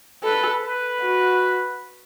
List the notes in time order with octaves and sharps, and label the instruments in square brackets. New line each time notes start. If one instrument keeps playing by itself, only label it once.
[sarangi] A4 [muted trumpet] B4
[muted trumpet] B4
[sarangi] F#4